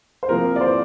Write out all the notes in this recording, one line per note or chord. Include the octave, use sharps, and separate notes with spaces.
C5
C3 F3 A#3 A#4
D5
C5